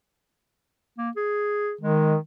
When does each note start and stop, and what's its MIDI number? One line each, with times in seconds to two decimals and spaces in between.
0.98 1.10 58
1.16 1.74 68
1.81 2.16 51
1.81 2.16 56